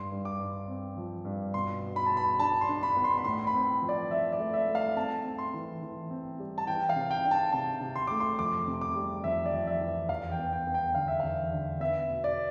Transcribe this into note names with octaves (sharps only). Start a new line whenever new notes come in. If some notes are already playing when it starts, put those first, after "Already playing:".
Already playing: G2 C6
G2
D6
G2
C4
F3
G2
B2 C6
B2
B5
B2 A5
B5
D4 A5
C6
D4
B5
B3
C6
B5
A2 C6
B5
C4
F3
D5
F3 E5
D5
A3
E5
A3
F5
C4 A5
C4
C6
E3
E3
C4
G3
A5
E3 G5
F5
C3
G5
D4
A5
C3 A5
C3
C6
A3 D6
C6
F2 D6
C3
D6
G3
F2 E5
D5
F2
E5
E3
E2 F5
G5
B3
G5
B3
G5
D3 F5
E5
E2 F5
D3
B3 E5
B2
D5